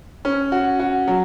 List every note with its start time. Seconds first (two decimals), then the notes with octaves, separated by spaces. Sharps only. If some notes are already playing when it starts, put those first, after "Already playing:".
0.25 C#4
0.52 F#4
0.80 F#4
1.08 F#3